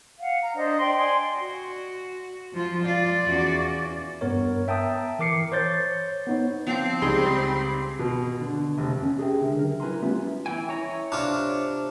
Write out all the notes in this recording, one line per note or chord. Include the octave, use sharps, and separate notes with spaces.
F5 F#5
A#5
D4 C5 D5 D#5
D5 G5 C6
D5 G#5 C6
F#4
F3 F4
F4 D5
E2 C#4 F#4
G2 B3 A#4 C#5
E5 G5 A5 A#5 D#6
E3 A#4 D6 C7 C#7
C5 C#5 G6 A6
B3 D#4 C#5
F3 C4 D6
C#2 G3 D#4 G#4 G5 B5 C6
B2
D3
F1
C#4
G4 G#4 A#4 B4 E5 G5
C#2 D3
F#3 A#4
E4 B4 G#5 A#5 C6
G3 A3 B3 C#4 E4 F4
E3 E4 G5 G#5
C#5 A#5
C3 D4 F4